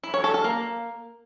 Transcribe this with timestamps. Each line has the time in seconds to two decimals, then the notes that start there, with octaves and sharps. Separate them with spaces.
0.03 E4
0.14 C#5
0.24 A4
0.34 A4
0.44 A#3